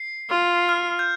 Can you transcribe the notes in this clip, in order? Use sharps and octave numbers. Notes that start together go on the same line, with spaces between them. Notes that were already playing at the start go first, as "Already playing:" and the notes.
Already playing: C7
F4
F6
G6